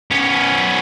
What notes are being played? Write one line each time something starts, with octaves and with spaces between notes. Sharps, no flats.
B3 C#4